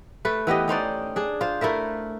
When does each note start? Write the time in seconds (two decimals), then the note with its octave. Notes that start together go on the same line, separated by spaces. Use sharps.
0.25 A3 B4
0.47 E3 B3 G4 D#5
0.68 C#4 D#4 C5 D5
1.16 D4 G#4
1.41 F4 C5
1.61 A3 E4 A#4 E5